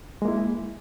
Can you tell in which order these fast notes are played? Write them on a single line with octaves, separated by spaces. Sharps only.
G#3 A#3 E4